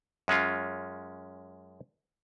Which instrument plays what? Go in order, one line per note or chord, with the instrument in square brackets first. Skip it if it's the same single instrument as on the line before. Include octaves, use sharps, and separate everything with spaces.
[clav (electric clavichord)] F#2 G#3 C#4 F4